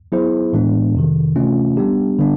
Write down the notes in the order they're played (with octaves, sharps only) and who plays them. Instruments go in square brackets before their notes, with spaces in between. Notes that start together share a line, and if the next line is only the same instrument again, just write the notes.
[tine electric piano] F#3 B3 E4 G#4 C5
A2 E3 G#3 B3 D4
F2 C3 D#3
C3 E3 A3 C#4 F4
G3 B3 D4 G4
D3 G3 B3 D4